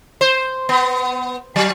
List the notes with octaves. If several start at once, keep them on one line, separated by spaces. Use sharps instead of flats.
C5
B3
F#3